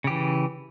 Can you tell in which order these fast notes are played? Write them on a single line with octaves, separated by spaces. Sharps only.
C#3 G4 E3